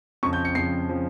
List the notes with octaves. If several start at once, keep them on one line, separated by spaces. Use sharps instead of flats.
F2 C#3 F3 C#6
G6
C#7
F2 C#3 F3 C7
C#3 F3